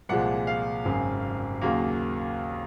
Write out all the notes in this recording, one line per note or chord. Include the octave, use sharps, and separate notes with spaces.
C2 A#2 F3 G#3 F#5
F5
G#1 F#2 C#3
D#2 C#3 F#3 A#3